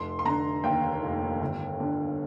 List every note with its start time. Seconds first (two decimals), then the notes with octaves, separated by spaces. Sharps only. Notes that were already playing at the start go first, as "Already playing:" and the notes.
Already playing: F1 C6
0.19 C6
0.25 D3 A#5
0.64 D#2 G5
1.03 F1
1.41 G1
1.80 D3